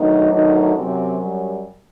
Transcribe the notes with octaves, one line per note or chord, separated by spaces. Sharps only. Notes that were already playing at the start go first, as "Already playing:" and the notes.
Already playing: D2 D3 D#3 F#3 D#4
D#3 D#4
F#2 C3 F#3 C4
G3